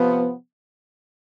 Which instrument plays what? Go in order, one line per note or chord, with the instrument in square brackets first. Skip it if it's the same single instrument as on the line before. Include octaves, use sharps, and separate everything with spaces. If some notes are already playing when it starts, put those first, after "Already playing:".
Already playing: [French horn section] C3 F3 B3